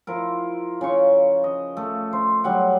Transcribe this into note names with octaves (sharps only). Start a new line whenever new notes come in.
F3 E4 A#4
C#3 C#5 C#6
D#5
A3
C5
F#3 G3 F#5